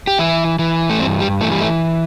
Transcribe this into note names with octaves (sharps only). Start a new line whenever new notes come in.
G4
E3 E4
E3
A3
G2 C4
G3
E3 A3
G3
A3